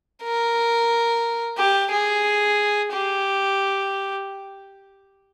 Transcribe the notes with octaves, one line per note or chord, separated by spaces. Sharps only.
A#4
G4
G#4
G4